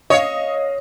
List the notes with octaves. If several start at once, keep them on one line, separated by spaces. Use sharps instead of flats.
C#5 D#5 F5